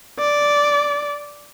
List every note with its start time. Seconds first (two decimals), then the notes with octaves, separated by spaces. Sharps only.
0.19 D5